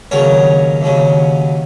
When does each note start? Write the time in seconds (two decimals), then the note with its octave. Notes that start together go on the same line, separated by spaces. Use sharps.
0.11 D#2 C#3 F#3 A#4 C#5
0.82 D#2 C#3 F#3